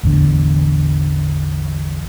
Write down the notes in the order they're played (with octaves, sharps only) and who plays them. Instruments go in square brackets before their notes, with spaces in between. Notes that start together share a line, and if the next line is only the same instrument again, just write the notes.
[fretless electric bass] A1 E2 D3